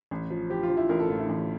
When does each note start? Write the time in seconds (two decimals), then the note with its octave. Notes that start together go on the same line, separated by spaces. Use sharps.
0.11 A1
0.30 F3
0.50 F3 G4
0.63 F4
0.70 F3
0.77 E4
0.89 A1 A#4
0.99 A4
1.09 A2 F4
1.19 E4
1.29 A1